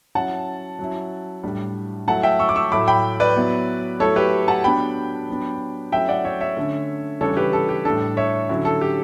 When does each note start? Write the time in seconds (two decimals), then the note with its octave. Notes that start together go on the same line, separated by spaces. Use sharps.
0.15 F#3 C#4 E4 F#5 A5
0.79 F#3 C#4 E4
1.43 A2 G3 D4
2.08 F#3 A3 E4 F#5 A5
2.23 E5 G5
2.39 C#6 E6
2.49 D6
2.56 C#6 E6
2.72 A2 F#3 A3 E4 B5 D6
2.88 G5 B5
3.20 B4 D5
3.36 F#3 B3 E4
4.00 F#3 A3 E4 A4 C#5
4.16 G4 B4
4.48 F#5 A5
4.64 F#3 B3 D4 G5 B5
5.29 F#3 B3 D4
5.92 F#3 A3 C#4 E4 E5 G5
6.09 D5 F#5
6.25 C#5 E5
6.40 C#5 E5
6.57 D3 A3 C#4
7.21 C#3 E3 G3 D4 A4 C#5
7.37 G4 B4
7.53 A4
7.69 G4
7.85 A2 G3 D4 A4
8.17 C#5 E5
8.49 D3 F#3 C#4 E4
8.65 A4
8.81 G4